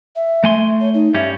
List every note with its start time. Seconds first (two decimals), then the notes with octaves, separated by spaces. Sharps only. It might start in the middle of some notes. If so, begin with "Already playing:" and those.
0.16 E5
0.44 A3 G#5 C6
0.81 C#5
0.94 D#4
1.14 G2 G3 C#4 E5